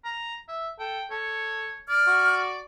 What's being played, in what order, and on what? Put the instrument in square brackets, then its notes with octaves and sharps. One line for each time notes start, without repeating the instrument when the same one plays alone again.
[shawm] A#5
E5
[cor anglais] A4 [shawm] G5
[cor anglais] A4 [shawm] C#5
[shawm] D5 [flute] F6
[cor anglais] F#4